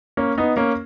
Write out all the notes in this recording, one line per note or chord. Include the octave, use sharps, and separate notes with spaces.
A#3 C#4
B3 D#4
A#3 C#4